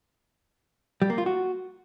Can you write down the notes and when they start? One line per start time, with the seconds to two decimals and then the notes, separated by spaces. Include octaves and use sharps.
1.02 G3
1.10 A#3
1.18 F4
1.26 F#4